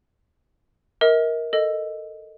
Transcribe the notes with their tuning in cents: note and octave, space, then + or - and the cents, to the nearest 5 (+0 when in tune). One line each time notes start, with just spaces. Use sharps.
A#4 +10 D#5 +45
A4 +15 D#5 +0